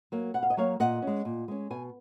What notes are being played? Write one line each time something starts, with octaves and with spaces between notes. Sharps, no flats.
F#3 A#3
B2 F#5
F5
D#5
F#3 A#3 C#5 F5
A#2 D#5 F#5
C#4
G#3
A#2
G#3 C#4
B2 G#5